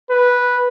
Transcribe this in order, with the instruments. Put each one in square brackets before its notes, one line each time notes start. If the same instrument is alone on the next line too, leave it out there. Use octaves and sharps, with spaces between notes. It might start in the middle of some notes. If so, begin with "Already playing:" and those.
[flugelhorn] B4